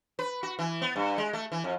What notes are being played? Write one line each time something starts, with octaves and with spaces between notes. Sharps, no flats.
B4
F#4
E3
B3
G2
G#3
A3
E3
F2